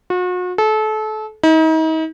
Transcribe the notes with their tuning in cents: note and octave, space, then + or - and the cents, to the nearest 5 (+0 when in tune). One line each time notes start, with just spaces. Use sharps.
F#4 -40
A4 -30
D#4 +40